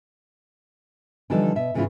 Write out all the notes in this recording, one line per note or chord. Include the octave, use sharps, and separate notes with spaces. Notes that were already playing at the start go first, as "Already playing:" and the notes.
D3 E3 F3 G3 D#4 A4
B2 E5
G#2 C#3 E3 C#4 E4 F4